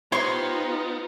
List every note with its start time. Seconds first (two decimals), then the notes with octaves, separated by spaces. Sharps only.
0.12 B3 D#4 F4 G4 C5 C#5 C6 C#6